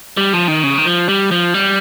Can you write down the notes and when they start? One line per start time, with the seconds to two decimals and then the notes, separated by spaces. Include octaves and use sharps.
0.17 G3
0.33 F3
0.48 D#3
0.63 C#3
0.78 D#3
0.86 F3
1.09 G3
1.31 F3
1.54 G3